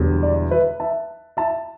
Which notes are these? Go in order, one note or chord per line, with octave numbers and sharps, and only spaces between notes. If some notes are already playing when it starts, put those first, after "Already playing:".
Already playing: E1 E2 D3 G3
D5
B4 E5
E5 A5
E5 A5